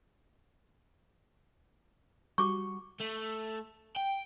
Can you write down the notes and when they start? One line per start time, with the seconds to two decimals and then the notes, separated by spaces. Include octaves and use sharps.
2.38 G3 F#4 C#6 D6
3.00 A3
3.96 G5